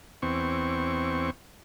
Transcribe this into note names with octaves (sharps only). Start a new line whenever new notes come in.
E2 C4 C#6